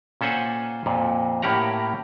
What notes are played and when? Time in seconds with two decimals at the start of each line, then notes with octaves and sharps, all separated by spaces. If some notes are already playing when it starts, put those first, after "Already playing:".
0.21 A#2 C#4 A4 C5 F#5 G#5
0.86 F2 A#2
1.42 A2 A#3 C#4 G4 F#5 A#5